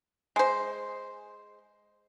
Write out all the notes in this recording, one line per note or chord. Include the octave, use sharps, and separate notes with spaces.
G#3 C5